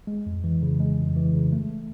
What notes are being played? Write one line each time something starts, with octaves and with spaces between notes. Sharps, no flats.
G#3
F2
E3
C#3
G#3
F2
E3
C#3
A3